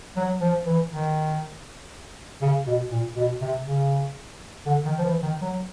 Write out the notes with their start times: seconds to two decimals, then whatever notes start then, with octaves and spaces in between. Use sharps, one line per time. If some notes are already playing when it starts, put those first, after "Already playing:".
0.17 F#3
0.41 F3
0.66 E3
0.91 D#3
2.42 C#3
2.67 B2
2.91 A#2
3.16 B2
3.41 C3
3.66 C#3
4.66 D3
4.85 D#3
4.99 F3
5.04 E3
5.23 D#3
5.41 F#3